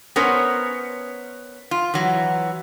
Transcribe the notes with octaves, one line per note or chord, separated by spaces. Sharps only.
B3 C#4 A#4 C5 C#5
F4
E3 F#3